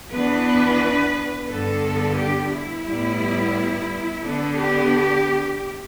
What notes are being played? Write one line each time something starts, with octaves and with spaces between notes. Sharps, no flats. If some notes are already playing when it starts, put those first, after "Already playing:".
E2 E3 B3 D4 B4
G2 D3 B3 D4 A4
G4
E4
A2 G3 B3
D3 B3 D4 A4
G4